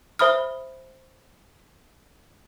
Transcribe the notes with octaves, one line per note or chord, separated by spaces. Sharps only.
C5 E5 B5 D#6 F6